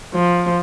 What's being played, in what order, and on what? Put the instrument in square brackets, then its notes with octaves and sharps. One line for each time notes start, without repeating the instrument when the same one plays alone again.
[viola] F3